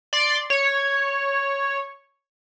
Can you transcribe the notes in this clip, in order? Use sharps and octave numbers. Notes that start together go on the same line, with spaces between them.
D5 C6
C#5